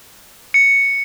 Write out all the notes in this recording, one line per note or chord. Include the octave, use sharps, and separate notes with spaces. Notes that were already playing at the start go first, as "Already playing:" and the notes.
C#7